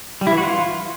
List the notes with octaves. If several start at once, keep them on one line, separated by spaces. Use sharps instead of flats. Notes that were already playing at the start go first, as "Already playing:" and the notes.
G3
E4
E3
F#4
F4